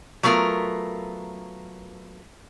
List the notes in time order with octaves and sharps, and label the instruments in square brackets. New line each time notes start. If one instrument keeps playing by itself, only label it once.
[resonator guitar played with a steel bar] F#3 A3 B3 F4 A#4